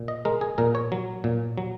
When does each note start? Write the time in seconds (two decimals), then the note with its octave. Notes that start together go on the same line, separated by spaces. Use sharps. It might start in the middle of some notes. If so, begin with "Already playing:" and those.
Already playing: A#2
0.08 D#5
0.25 G#3 A#4
0.41 G#4
0.58 A#2 A#4
0.75 C#5
0.92 F#3
1.24 A#2
1.58 F#3